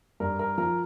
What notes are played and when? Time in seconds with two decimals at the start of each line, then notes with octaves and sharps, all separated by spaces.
0.20 G2 A#4
0.39 A#4
0.58 F3 A#4